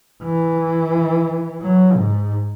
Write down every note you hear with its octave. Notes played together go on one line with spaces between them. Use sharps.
E3
F#3
G#2